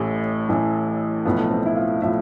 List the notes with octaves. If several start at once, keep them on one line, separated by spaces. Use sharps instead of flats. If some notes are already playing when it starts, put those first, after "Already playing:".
Already playing: A1 A2 E3 G4
A1 A2 E3
B1 A2 F3 B3
C4
E4
F4
A2 F3 E5